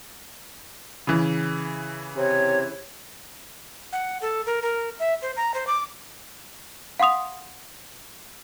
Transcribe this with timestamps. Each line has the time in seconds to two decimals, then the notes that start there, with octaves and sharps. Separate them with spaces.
1.07 C#3 E3
2.17 C3 C#5
3.92 F#5
4.22 A4
4.46 A#4
4.62 A#4
4.99 E5
5.22 C5
5.36 A#5
5.54 C5
5.67 D6
6.99 F5 F#5 C6 D#6 F7